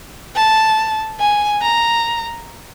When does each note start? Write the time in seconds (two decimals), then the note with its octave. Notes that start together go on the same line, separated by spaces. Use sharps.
0.35 A5
1.20 G#5
1.61 A#5